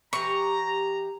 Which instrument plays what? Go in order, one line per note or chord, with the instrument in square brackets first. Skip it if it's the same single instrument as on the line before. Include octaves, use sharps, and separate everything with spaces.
[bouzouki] E3 G4 [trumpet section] A#5 [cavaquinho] C#6